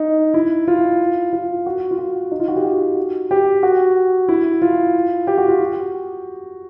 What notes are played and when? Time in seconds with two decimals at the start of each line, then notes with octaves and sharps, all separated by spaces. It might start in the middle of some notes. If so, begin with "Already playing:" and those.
Already playing: D#4
0.34 E4
0.67 F4
1.33 F4
1.66 F#4
1.91 F4
1.99 F#4
2.31 D#4
2.39 F4
2.48 F#4
2.56 G4
2.65 F#4
3.31 G4
3.63 F#4
4.29 E4
4.62 F4
5.27 G4
5.38 F#4
5.48 F4
5.59 F#4